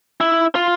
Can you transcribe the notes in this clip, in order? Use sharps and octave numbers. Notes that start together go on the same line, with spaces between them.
E4
F4